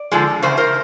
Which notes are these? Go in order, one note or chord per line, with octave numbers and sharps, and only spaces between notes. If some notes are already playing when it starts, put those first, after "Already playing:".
Already playing: D5
D3 F3 G#3
E2 C#3 C5
A#4 C5